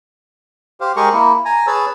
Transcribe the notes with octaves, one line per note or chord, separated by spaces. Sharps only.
G4 C5 F5
G#3 G4 G#4 A#4 C#6
A#3 E4
G#5 A#5
G#4 B4 C#5 A5 E6